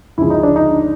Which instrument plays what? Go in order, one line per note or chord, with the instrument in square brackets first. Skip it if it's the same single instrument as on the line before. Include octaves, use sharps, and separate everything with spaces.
[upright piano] D2 C#3 F3 G#3 E4
D#4
D4
D#4